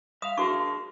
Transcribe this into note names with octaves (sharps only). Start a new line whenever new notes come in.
E5 F5 D#6
D4 F#4 G#4 A#4 C#6